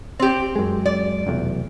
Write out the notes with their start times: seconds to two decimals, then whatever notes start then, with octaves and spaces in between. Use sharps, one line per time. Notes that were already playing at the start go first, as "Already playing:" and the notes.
0.19 C4 G4
0.56 F#2 G#3
0.85 D5
1.27 F1 B1 E2